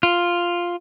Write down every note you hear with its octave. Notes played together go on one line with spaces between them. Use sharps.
F4